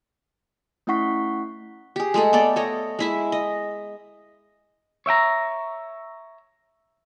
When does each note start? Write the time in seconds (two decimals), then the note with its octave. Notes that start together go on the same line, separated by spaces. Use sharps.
0.87 A3 C#4 E4 F#5 C#6 B6
1.96 G4 G#4
2.14 G#3 A3 G#4 A4
2.33 B3 A4 D5 G5
2.56 A4 C#5 D#5
2.99 G#3 E4 E5
3.32 D#5
5.06 C#5 E5 G5 A#5